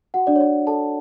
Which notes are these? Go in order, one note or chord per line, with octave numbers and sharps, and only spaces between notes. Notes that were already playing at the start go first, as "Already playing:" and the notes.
F#4 F#5
D4 D5
C#5
D4 D5
A4 A5